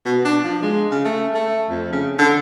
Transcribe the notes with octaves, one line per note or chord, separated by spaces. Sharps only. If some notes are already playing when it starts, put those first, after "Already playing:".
B2
D4
F3
G#3
C#3
A3
A3
F2
C#3
D3